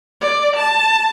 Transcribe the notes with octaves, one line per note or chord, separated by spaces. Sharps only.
D5
A5